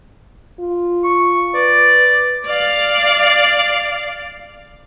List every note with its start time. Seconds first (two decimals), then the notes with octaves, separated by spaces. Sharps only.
0.60 F4
1.04 C#6
1.54 B4 D5
2.46 D5 F5